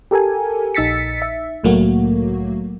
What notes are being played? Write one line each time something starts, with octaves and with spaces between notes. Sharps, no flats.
G4 A4 A#4 G#5
A#1 D#4 E6 A6 B6 C#7
E5
C2 A2 F#3 A3 A#3 F#4